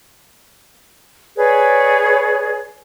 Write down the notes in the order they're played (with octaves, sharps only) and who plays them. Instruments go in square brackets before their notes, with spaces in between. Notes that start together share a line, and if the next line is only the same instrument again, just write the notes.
[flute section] G#4 B4 C#5 D5